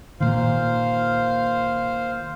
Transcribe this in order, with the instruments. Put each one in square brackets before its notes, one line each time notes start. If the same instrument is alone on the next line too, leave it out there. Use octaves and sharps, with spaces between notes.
[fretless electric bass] A#2 D#3 [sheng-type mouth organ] C5 F5